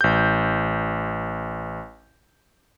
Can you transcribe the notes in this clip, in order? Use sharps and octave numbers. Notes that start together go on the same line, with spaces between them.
A1 G6